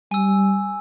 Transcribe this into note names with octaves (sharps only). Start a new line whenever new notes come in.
G3 G#5 E6